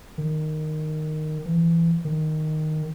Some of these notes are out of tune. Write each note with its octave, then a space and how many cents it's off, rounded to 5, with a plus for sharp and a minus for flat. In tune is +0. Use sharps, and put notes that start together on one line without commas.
D#3 -10
E3 +20
D#3 -5